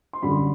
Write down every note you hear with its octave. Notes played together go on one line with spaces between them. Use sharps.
C6
F#2 D3 G3 B5